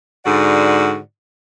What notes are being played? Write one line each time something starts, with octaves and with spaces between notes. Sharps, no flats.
G#2 D3 F#4 D5 F#5